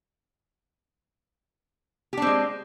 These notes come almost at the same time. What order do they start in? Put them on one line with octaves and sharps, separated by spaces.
G4 D4 C4 G#3